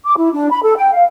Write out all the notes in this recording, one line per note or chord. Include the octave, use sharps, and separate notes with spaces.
D6
E4
D4
B5
A4
G5
F5